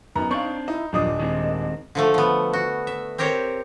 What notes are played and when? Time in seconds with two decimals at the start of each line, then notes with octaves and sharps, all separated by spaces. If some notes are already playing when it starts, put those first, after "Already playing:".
0.16 F#2 B3 D#4 A#5
0.31 C4 D4 F5 C#6
0.68 D#4 E4
0.93 D#1 F#2 F3 D4 D#5 D#6
1.19 D#3 G#3 C4
1.95 D3 F3 A3
2.14 F3 B3
2.53 F#4
2.87 E5
3.18 C4 G4 A#4 C5 C#5